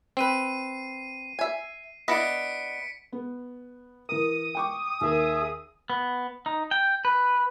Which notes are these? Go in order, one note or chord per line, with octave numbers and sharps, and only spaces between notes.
C4 B4 C7 D#7
E5 G#5
B3 D4 E4 D#5 B6 C#7 D7
B3
E3 A#4 D#6
G5 C#6 D6
D#2 G#4 A#4 E5
B3
D#4
G5
B4